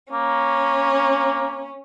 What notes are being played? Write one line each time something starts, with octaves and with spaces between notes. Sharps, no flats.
A#3 C#4